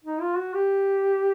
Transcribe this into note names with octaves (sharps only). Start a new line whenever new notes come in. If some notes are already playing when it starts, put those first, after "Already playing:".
D#4
F4
F#4
G4